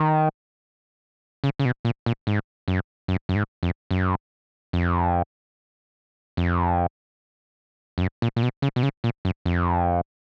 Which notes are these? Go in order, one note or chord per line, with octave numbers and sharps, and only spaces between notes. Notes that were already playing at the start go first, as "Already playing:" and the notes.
Already playing: D#3
C#3
C#3
B2
A#2
A#2
G#2
F#2
F#2
F#2
G#2
F2
F#2
F2
F2
F2
F#2
A#2
A#2
B2
C#3
B2
C#3
A#2
F#2
F2